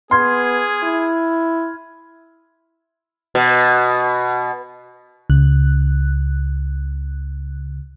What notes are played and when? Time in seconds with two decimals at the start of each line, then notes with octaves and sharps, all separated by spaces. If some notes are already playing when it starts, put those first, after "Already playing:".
0.11 B3 G#4 C6 F6 G#6
0.84 E4
3.35 B2
5.30 C#2 C#3 F#6